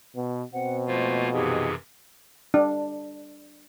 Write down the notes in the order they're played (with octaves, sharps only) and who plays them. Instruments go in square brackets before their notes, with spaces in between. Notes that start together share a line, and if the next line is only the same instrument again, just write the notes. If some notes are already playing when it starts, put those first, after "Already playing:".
[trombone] B2 [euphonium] B3
[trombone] B2 [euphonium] C4 [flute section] F#5
[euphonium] F2 [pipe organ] A3 A#3 F4 [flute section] C5
[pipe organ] F#2 C3 E3 [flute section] D#4 G4 G#4
[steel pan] D4